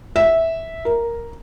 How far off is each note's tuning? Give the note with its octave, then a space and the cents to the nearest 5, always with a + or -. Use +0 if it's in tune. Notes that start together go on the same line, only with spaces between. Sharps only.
E5 -10
A#4 +0